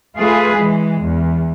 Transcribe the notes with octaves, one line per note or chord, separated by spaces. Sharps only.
A3 F4 G#4 B4
E3 G#3
E2